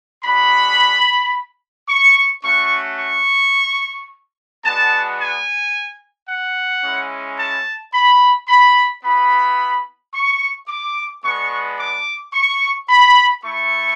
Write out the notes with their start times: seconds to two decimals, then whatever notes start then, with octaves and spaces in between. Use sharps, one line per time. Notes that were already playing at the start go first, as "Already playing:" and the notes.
0.24 G#3 D4 F#4 B5
1.88 C#6
2.43 A3 C#4 F#4 C#6
2.98 C#6
4.64 G#3 B3 D4 F#4 A5
5.19 G#5
6.28 F#5
6.83 G#3 C#4 E4
7.39 A5
7.93 B5
8.48 B5
9.03 B3 E4 B5
10.14 C#6
10.68 D6
11.24 G#3 B3 D4 C#6
11.78 D6
12.33 C#6
12.88 B5
13.44 A3 E4 C#6